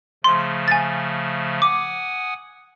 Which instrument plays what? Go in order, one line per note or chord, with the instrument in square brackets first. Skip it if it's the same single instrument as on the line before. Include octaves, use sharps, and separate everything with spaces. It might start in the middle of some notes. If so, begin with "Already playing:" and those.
[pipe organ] C#3 F3 A3 [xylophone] C6
[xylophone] G#5 A6
[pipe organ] F#5 G#5 D#6 [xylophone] D6